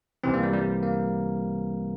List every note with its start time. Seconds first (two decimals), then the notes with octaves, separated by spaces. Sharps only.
0.24 C2 C3 E3 C4
0.34 A#3
0.43 G3
0.53 G3
0.83 A#3